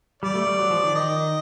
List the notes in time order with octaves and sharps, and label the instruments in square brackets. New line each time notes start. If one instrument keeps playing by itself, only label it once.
[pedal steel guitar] G3 [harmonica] D5
[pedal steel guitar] A3
G3
F#3
F3
D#3
[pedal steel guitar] D#3 [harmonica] D#5